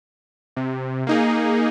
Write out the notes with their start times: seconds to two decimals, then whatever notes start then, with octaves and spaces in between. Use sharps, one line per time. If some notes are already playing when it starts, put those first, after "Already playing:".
0.56 C3
1.07 A#3 D#4 G#4